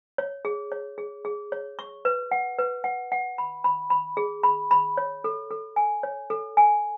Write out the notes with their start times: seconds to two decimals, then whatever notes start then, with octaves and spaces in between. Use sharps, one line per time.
0.18 C#5
0.45 G#4
0.72 C#5
0.98 G#4
1.25 G#4
1.52 C#5
1.79 C#6
2.05 B4
2.31 F#5
2.59 B4
2.84 F#5
3.12 F#5
3.38 B5
3.64 B5
3.90 B5
4.17 G#4
4.43 B5
4.71 B5
4.97 C#5
5.24 A4
5.51 A4
5.76 G#5
6.03 C#5
6.30 A4
6.57 G#5